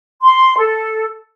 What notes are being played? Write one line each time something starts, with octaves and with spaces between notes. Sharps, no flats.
C6
A4